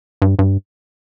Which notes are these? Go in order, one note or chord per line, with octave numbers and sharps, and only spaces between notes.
G2
G2